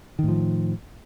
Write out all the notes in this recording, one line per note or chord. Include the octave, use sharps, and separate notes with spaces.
A2 D#3 F3